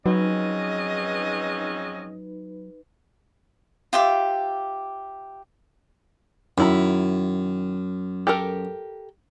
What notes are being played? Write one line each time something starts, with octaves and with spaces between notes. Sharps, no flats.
F2 G#2 F#3 C#4 D#4 B4 D#5
F4 G4 E5 D6
F#2 D#3 E4 A#5
G4 A4 A#4